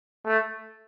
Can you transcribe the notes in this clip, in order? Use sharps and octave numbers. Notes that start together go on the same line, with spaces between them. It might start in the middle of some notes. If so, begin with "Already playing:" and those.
A3